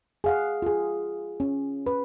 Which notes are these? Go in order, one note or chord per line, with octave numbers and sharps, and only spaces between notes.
G#4 F5 F#5
F4 G#4
C#4
B4